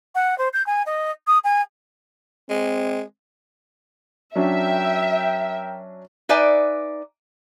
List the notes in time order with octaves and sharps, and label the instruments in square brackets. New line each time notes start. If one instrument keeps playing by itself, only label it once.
[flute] F#5
C5
G6
G#5
D#5
D#6
G#5
[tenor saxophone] G#3 [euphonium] C4
[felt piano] F#3 C#4 D4 [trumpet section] A#4 G5 [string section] E5
[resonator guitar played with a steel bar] D#4 B4 D5 E5 G#5